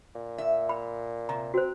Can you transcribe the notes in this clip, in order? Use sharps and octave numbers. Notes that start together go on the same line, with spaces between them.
A#2
E5
B5
C3 A#5
C4 F#4 C5